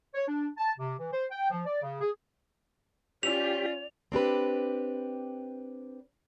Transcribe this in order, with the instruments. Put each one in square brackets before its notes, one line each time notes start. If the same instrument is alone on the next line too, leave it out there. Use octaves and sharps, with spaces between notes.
[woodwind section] C#5
D4
A5
C3
E3
C5
G5
F3
D5
C#3
G#4
[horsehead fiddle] C#4 F4 [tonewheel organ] G4 [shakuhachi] D5 [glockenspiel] F7
[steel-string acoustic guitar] C4 D4 G4 B4